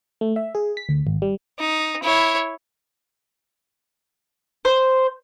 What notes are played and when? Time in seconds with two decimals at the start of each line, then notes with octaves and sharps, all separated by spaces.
0.21 A3
0.36 E5
0.55 G#4
0.77 B6
0.89 D2
1.07 G#1
1.22 G3
1.60 D#4
2.03 E4 C#5
4.65 C5